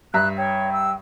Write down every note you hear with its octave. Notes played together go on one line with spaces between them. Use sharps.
G2 E5 A#5 F#6
C#5 G5
E6